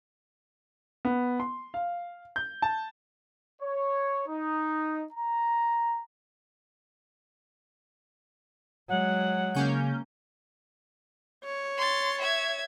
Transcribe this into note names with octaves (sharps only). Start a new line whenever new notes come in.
B3
C6
F5
G6
A5
C#5
D#4
A#5
F#3 G#3 F#5
C#3 A#3 C#4 G6
C#5
C6 A6
E5 G#6